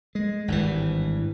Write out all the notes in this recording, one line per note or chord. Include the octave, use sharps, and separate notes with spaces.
G#3
G#1 G2 D3 E3